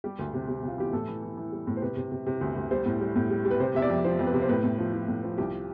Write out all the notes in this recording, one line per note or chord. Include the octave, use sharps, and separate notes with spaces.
G3 G4
D2
C3
C3
C3 F4
E3 G4
A2 A4
E3
E3
E3
G3
A2
C5
C3 B4
C3
C3
C3
D2
D2
G3 C5
A2
G3
A2
G3
G3
B4
C3 C5
C3 E5
D5
F2
F3 C5
F2
B4
C3
C5
A2 B4
A2
F3
F3
A2
F3
C2 G4